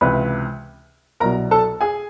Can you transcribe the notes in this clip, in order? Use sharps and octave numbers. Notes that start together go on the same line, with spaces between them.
C#2 C3 E3 B4 B5
C2 B2 F#3 A#4 A#5
A4 A5
G#4 G#5